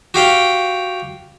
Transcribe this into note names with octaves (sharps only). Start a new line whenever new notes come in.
F#4 G4 F5 G5